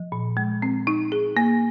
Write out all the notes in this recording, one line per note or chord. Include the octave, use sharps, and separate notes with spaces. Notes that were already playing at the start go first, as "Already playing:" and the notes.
Already playing: F3
A#2
G#3
C4
D#4
G#4
A#3